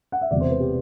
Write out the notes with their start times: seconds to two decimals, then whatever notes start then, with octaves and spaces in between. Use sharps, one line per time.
0.12 F#5
0.21 E5
0.31 E1 E2 C3 D5
0.41 C5
0.50 B4
0.60 G4